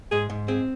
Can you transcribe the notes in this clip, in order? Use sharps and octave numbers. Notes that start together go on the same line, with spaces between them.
G#2 G#4
G#2
C4 G#4